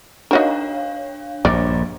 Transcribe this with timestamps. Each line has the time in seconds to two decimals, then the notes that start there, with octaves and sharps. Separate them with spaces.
0.31 D4 D#4 F#4 A#4 C#5 F5
1.45 A#1 G2 D5